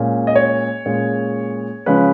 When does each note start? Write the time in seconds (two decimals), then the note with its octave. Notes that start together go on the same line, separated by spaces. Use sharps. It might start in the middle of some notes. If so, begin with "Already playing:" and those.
Already playing: A#2 G#3 C#4
0.27 D#5
0.36 C#5
0.86 A#2 G#3 C#4
1.86 C#3 F3 G#3 C#4 B4